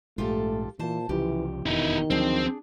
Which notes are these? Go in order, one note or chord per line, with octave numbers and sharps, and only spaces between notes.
A#1 G#2 A3 F4 G4 A4
A#2 E3 C5 A5
C2 C#3 E3 F3 G4
F1 E2 B2 D#3 D#4 E4
D2 F3 F#3 C4 D4 G#4